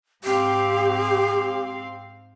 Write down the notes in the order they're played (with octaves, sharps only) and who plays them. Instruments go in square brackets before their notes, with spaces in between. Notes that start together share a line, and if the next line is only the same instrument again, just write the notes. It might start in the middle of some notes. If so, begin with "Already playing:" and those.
[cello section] G#2 C4 F5 [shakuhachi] G4